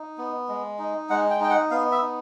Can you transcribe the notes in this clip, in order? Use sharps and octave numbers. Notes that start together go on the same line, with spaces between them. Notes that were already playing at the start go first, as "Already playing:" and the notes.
Already playing: D#4
B3
G#3
D#4
G#3 F#5
G5
D#4 G5
F#5
B3 F5
E5
D#4